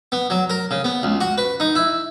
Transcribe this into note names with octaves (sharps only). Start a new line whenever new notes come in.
B3
F#3
A#4
C#3
B3
C#2
F#4
B4
D#4
E4